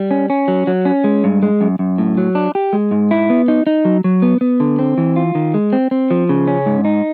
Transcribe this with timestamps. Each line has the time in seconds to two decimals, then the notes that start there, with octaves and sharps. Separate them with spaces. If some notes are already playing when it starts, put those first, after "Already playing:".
Already playing: G3
0.11 C#4
0.30 C#4
0.48 F#3
0.67 F#3
0.85 C#4
1.04 G#3
1.24 G2
1.42 G#3
1.61 F#2
1.79 F#2
1.98 A2
2.18 F#3
2.35 D4
2.55 G4
2.73 G#3
2.91 G#2
3.11 E4
3.30 B3
3.48 D#4
3.67 D#4
3.85 F#3
4.04 F#3
4.22 B3
4.41 B3
4.60 D3
4.79 C4
4.98 E3
5.16 F4
5.35 D#3
5.54 G#3
5.73 C4
5.91 C4
6.11 F3
6.29 C#3
6.48 C#4
6.66 G#2
6.85 D#4